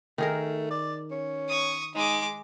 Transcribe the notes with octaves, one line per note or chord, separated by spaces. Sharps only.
D#3 A3 G#4 A#4
D5
C#4
C#6 D#6
G#3 D#4 D6